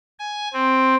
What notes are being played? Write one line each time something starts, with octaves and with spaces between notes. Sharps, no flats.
G#5
C4